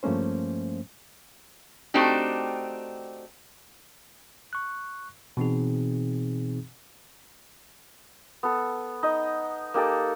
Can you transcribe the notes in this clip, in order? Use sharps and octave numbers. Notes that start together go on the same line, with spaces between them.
G2 F3 A3 A#3 C#4 C5
A3 C4 D4 D#4 F#4 G4
C#6 F#6
B2 E3 C4 D#4 G#4
B3 A4
D#4 D#5
A#3 D#4 G4 A4